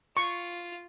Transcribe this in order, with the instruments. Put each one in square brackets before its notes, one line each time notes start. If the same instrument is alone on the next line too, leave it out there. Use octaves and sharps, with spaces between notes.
[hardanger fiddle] F4 [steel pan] C#6